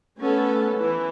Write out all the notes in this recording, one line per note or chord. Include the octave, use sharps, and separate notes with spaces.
A3 B3 C#4 A4
E3 E4